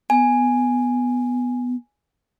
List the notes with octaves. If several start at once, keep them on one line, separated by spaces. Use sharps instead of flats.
B3 G#5